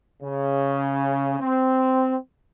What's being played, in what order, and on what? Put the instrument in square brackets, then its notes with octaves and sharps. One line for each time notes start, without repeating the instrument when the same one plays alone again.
[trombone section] C#3
C4